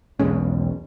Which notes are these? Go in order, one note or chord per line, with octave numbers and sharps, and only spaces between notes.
B1 E2 G#3 C#4